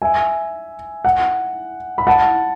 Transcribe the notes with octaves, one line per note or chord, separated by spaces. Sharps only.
E5 G#5
F#5
B5
F#5 A5